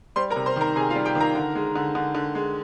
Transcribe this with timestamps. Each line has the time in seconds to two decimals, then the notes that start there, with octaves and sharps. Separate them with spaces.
0.16 G3 C5 C6
0.30 A#4 A#5
0.36 C3
0.46 C5 C6
0.56 D#3 A#4 A#5
0.76 C3 G#4 G#5
0.90 F4 F5
0.96 G3
1.06 G4 G5
1.15 D#3
1.20 A#4 A#5
1.35 D3
1.55 G#3
1.76 D3
1.95 D3
2.15 D3
2.35 G#3